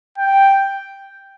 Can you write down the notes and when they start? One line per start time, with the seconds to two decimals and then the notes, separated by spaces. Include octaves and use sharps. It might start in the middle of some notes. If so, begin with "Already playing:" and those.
0.18 G5